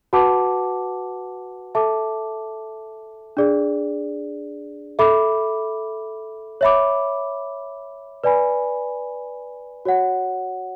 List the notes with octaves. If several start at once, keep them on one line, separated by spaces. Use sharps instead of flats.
F#4 B4 F#5 A5 D6
A4 E5 A5 D6
D4 G#4 D5
A4 E5 B5 D6
C#5 E5 B5 D6
B4 D5 G#5 B5
F#4 C#5 F#5